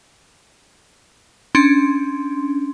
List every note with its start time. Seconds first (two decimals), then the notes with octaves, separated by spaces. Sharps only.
1.55 C#4 D4 C6